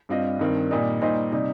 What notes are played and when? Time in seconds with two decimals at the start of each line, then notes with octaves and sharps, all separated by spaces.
0.09 G2 G3 C4 F4 D#5
0.39 G2 D#3 C4
0.71 A#2 G3 D#4
1.01 A#2 G3 D#4 C5 D#5
1.32 C3 G3 C4 D#4